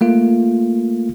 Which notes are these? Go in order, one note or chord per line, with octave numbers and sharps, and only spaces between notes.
A3 A#3 F4